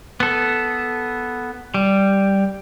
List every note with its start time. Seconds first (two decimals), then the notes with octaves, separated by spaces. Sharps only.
0.20 B3 A4
1.74 G3